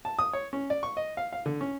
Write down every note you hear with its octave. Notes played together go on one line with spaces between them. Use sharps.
A5
D#6
C#5
C#4
D5
C#6
D#5
F5
F5
D3
C#4